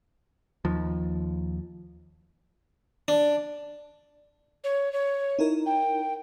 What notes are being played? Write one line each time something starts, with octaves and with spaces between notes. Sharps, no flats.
D#2 F3
D4
C#5
C#5
D#4 E4 A#4
G5